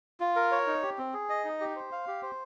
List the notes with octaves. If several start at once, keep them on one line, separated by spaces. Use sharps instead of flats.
F4
A#4
C#5
D#4
G4
C4
G#4
D#5
D#4
G4
C5
F5
G4
C5